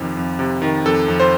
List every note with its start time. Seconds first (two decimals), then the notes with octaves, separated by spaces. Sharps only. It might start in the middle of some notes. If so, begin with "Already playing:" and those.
Already playing: F2 C3 D#3
0.17 F2
0.39 C3
0.62 D#3
0.85 F2 A4
1.08 F2
1.20 C5